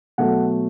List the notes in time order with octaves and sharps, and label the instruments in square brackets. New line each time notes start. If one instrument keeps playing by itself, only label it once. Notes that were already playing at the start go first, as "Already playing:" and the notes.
[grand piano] B2 F#3 A3 F#5